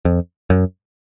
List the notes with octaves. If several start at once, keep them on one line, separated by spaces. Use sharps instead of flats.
F2
F#2